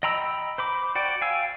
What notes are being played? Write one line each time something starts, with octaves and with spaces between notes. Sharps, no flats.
D#5 G5 A#5 B5 E6
C5 B5 D6
F#4 D5 G5
F5 G5 G#5 E6